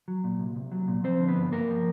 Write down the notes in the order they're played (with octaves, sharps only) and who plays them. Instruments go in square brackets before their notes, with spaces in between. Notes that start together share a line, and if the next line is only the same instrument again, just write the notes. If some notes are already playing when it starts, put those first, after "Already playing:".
[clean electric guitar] F#3
A#2
C2
C2
F#3
A#2
F3 C4 C5
D3
B3 B4
G2
G2 A#3 A#4
F3